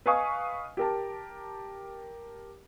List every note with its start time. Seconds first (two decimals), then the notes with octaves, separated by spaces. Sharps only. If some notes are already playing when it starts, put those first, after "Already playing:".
0.06 B4 D#5 F5 G#5 C#6 D#6
0.77 G4 A#4 A5